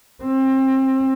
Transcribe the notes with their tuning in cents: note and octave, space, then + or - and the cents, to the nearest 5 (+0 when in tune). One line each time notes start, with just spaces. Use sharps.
C4 +25